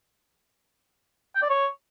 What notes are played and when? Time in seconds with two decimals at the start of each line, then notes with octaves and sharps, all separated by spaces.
1.35 G5
1.43 D5
1.50 C#5